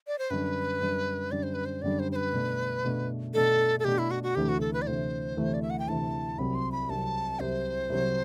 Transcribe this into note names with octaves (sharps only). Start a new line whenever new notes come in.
D5
C5
F#2 D3 G3 D4 B4
F#2 D3 G3 D4
F#2 D3 G3 D4 D5
C5
B4
C5
F#2 D3 G3 D4 D5
C5
C5
B4
B2 A3 D4
B2 A3 D4
B2 A3 D4 A4
A4
B2 A3 D4 G4
E4
F#4
F#4
D2 C3 E3 A3 G4
F#4
A4
B4
D5
D2 C3 E3 A3 C5
D2 C3 E3 A3
D5
E5
F#5
G5
D2 C3 E3 A3 A5
C2 C3 F#3 C4 B5
C6
B5
C2 C3 F#3 C4 A5
C2 C3 F#3 C4 C5
C2 C3 F#3 C4